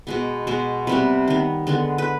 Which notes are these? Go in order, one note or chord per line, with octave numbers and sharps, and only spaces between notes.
B2 G#3 B3
B2 G#3 B3
C3 G3 B3 B4
D#3 B3
D3 G#3 B3
B4